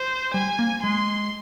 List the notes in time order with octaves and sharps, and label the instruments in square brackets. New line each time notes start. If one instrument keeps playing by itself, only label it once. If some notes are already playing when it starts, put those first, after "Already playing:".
Already playing: [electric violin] C5
[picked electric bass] G3 [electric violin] G#5
[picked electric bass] A#3
[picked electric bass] G#3 [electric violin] C6